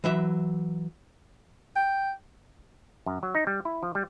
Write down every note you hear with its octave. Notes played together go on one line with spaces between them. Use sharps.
E3 F#3 E5
G5
F#2
F#3
D#4
G3
E4
F3
G3